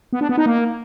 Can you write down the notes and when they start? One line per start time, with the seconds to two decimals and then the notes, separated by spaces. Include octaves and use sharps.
0.13 B3
0.21 D4
0.29 B3
0.38 D#4
0.46 A#3